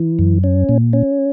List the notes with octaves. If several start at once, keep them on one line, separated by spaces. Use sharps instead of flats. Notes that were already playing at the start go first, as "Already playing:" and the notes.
Already playing: E3
F#2
C#4
A#2
C#4